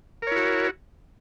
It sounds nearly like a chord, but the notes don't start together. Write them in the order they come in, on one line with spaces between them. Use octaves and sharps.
A#4 C#5 E4 F#4